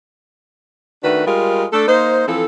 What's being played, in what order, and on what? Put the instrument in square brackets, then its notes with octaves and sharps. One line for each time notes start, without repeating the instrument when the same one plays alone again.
[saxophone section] D#3 A3 D4 F#4 B4
G3 G#3 F4 A#4
A3 D4 A4
A#3 D#4 C5
E3 F3 C4 A4